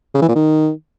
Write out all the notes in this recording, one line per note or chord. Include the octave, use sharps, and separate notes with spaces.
C#3
E3
A#2
D#3